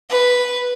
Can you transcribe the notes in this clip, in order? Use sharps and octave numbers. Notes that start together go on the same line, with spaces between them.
B4